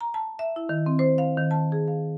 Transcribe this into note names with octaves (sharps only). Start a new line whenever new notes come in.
A#5
A5
E5
E4
D#3
C4
C5
F5
D#3
A5
G#4
F5